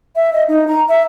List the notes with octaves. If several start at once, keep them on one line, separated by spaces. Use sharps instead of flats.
E5
D#5
D#4
A#5
E5